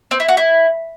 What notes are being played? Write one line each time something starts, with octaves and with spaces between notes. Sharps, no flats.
C4
E4
F#4
E4